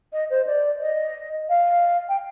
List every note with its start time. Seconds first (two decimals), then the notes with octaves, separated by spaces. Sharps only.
0.13 D#5
0.30 C5
0.47 D5
0.81 D#5
1.49 F5
2.09 G5